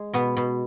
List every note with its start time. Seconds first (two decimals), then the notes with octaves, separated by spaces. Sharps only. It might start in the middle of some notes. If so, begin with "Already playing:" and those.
Already playing: G#3
0.14 B2 B3
0.37 B2